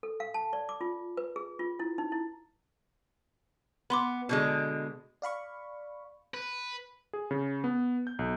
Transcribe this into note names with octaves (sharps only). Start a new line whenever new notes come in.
A4
F5
A5
D5
D6
F4
B4
G#4
F4
E4
D#4
E4
B3 B5 C6 D6
B2 D3 G#3
D5 F5 B5 C#6
B4
G#4
C#3
B3
G6
B1